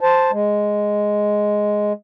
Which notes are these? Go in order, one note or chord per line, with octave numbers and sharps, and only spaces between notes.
C5 A5
G#3